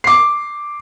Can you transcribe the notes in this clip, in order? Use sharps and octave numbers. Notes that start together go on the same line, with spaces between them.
D6 C7